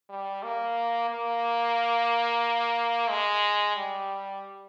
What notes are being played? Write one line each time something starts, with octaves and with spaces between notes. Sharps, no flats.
G3
A#3
A#3
G#3
G3